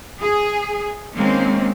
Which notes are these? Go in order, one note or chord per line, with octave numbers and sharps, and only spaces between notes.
G#4
D#3 G#3 A#3 C4 C#4